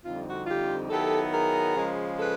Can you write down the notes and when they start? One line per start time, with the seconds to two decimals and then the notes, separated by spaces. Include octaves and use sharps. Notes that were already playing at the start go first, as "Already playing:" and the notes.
0.04 F2 D3 G3 C4 D#4 F4
0.25 F#4
0.47 F4 G4
0.89 D#3 F#3 B3 E4 G4 A4
1.32 G#4 A#4
1.75 C#3 F3 G#3
2.19 A4 B4